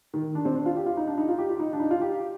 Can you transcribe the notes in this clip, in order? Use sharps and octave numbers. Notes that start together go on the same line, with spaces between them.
D#3
D4
C4
D4
F4
G4
F4
D#4
D4
D#4
F4
G4
F4
D#4
D4
D#4
F4
G4